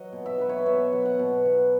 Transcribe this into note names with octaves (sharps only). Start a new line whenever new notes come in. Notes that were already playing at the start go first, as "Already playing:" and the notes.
Already playing: F#3 D#5
B2
E5
F#3 B4
C#5
D#5
B2 E5
F#3
F#5
B2
F#3